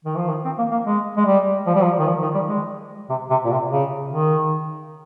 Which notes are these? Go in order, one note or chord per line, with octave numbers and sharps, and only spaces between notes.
D#3
F3
D#3
C4
A#3
A#3
G#3
G#3
G3
F3
G3
F3
D#3
F3
D#3
G3
G#3
C3
C3
A#2
C3
C#3
D#3